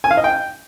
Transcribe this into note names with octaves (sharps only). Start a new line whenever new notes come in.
G#5
F5
D#5
G5